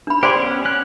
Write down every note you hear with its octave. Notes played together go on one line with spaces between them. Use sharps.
D4 B5
G4 G#4 C5 D5 C6
B3 C#4
C#4 F#6